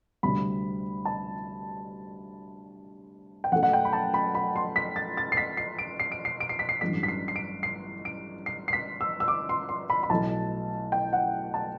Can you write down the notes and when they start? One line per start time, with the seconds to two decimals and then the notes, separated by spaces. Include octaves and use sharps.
0.23 D2 C3 G3 B5
1.05 A5
3.44 G5
3.52 F#2 F#3 A3 F#5
3.63 F#5
3.73 G5
3.85 B5
3.93 A5
4.14 B5
4.35 B5
4.56 C6
4.76 B6
4.96 A6
5.17 A6
5.32 C7
5.37 B6
5.57 C7
5.79 D7
6.00 C7
6.12 D7
6.25 C7
6.40 D7
6.49 C7
6.59 B6
6.69 C7
6.81 A1 G2 F#3 A3 B6
7.03 B6
7.08 C7
7.28 C7
7.36 D7
7.63 C7
8.05 D7
8.46 C7
8.68 C7
8.73 B6
9.01 E6
9.20 E6
9.28 D6
9.49 C6
9.69 C6
9.90 B5
10.03 B5
10.10 B1 A2 F#3 A3 A5
10.92 G5
11.13 F#5
11.54 A5